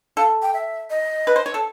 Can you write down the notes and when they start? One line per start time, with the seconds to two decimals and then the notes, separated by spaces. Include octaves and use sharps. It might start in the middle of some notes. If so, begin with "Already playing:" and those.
0.17 A4 F5
0.42 G5
0.54 E5
0.90 D#5
1.27 B4
1.36 C5
1.46 C#5
1.54 A4